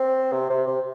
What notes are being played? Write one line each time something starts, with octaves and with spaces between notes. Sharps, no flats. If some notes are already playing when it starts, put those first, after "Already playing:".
Already playing: C4
C3
C3
C3